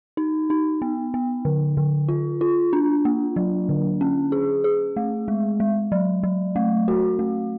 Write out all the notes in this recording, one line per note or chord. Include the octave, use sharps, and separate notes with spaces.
D#4
D#4
B3
B3
D3
D3
F4
F4
D4
A#3
F#3
D3
C#4
G#4
G#4
A3
G#3
G#3
F#3
F#3
A3
F#4
A3